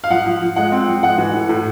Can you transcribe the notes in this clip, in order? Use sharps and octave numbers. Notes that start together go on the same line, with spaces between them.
F5
F3 F#5
F3
F3
G#3 F#5
C4
F3
G#3 F#5
E3
A2
A2